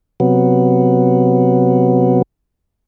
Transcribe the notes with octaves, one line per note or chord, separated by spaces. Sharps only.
C3 F#3 B3